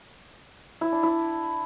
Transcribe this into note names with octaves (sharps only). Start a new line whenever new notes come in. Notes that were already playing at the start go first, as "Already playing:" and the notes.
E4
D4
E4